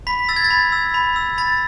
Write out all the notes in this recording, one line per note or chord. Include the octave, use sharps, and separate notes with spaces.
B5 B6
E6 A6
G#6
A6
B5
E6
B5
E6
B5 A6